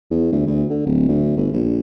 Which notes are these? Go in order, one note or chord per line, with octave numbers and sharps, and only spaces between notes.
E2
D2
D2
D3
D1
D2
G1
A#1